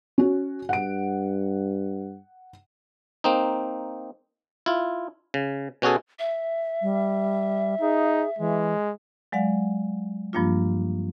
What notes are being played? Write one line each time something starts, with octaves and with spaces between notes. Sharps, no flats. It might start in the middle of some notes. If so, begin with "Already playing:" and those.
C#4 F#4
G2 F#5 D7
A#3 C4 D#4
E4 F4
C#3
B2 C#4 F#4 G#4 A4
E5
G3
D#4 G#4
E3 G#3
F#3 G#3 D5 F5 F#5
G2 F3 G3 A#3 D4 F4